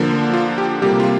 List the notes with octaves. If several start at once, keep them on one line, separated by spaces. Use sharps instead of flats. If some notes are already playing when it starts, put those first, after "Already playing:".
Already playing: D3 F3 A#3
F4
G4
C3 G3 A#3 G4
F4